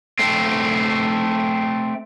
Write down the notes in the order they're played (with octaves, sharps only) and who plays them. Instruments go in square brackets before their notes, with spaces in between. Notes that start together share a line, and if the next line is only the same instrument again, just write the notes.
[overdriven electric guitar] A3 C4